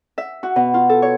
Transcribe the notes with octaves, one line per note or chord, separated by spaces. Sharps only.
E5
F#4
B2
F4
A4
C#5